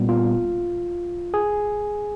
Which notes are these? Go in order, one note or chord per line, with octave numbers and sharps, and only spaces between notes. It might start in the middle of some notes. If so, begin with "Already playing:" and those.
Already playing: A#2 G3 B3
F4
G#4